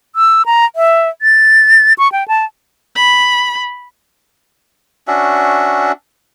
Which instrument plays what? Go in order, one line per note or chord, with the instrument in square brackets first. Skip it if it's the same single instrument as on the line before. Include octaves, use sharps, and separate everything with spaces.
[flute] E6
A#5
E5
A6
C#6
G5
A5
[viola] B5
[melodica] C#4 D4 F#4 E5